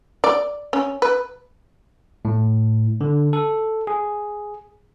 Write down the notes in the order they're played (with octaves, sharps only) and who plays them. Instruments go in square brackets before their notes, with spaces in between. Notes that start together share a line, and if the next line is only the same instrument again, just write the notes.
[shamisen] D5
C#4
B4
[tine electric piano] A2
D3
A4
G#4